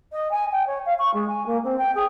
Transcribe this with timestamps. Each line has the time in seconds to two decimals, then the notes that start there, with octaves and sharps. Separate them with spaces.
0.12 D#5
0.31 G#5
0.52 G5
0.67 C#5
0.86 F5
0.99 C#6
1.14 G#3
1.29 G#5
1.46 A#3
1.64 C4
1.78 G5
1.95 G#4